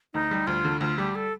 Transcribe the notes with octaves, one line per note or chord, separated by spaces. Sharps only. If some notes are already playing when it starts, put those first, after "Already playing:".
D2 D#4
G3
D2 F4
D3
D2 F4
G3 G4
A4